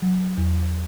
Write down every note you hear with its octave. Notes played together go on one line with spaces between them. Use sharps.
F#3
E2